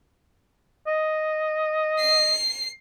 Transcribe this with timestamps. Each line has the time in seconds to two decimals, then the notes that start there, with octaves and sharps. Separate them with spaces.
0.87 D#5
2.00 C7